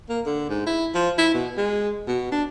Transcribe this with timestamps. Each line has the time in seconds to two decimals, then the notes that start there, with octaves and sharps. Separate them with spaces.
0.09 A#3
0.26 D3
0.49 G#2
0.66 E4
0.94 F3
1.18 E4
1.34 B2
1.57 G#3
2.08 B2
2.32 D4